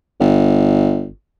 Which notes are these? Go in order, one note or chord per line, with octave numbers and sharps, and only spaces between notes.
G1